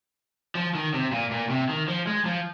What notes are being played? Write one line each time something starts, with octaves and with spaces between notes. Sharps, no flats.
F3
D#3
C3
A#2
A#2
C3
D#3
F3
G#3
F3